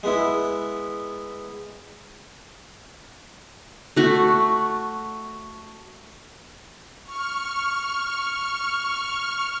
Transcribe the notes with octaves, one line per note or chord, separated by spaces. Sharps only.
G#3 B3 E4
A3 F#4
C#6 F6